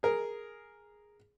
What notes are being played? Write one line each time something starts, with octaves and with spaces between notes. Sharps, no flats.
G#4 A#4